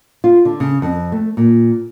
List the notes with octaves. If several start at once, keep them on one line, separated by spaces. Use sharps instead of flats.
F4
D3
C#3
F2
A3
A#2